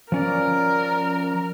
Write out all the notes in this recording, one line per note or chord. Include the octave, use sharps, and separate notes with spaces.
F3 C#4 A#4 D5